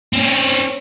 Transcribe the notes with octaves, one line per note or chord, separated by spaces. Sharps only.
C4 C#4